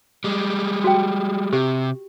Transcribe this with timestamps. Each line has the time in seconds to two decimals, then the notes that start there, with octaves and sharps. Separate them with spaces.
0.24 G3 G#3
0.84 F#4 G5
1.53 C3 G4